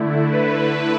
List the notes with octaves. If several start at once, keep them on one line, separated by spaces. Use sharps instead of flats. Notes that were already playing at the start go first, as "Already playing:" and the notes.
Already playing: D3 A3 E4
B4